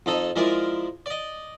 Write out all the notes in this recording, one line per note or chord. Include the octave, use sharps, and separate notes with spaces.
F2 D#4 A4 A5
F3 G#3 E4 A#4 D5
D5 D#5